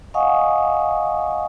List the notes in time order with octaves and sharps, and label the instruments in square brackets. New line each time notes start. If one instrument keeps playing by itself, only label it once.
[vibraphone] D#5 F5 F#5 G#5 C#6 D#6